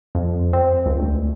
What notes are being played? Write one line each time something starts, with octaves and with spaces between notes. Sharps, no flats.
F2
C4
C#2
D2